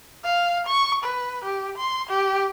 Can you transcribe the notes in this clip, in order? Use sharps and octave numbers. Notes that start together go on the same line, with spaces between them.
F5
C#6
B4
G4
C6
G4